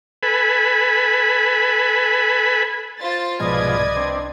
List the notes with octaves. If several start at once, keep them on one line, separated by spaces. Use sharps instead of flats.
A4 B4 G#5 B5
F4 C5 A6
C2 G#2 B2 F3 B4 D5 D#5 G#6
C4 D4